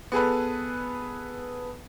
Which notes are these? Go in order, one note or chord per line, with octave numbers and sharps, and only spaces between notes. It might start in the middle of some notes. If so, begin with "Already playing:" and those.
B3 G#4 A4 B4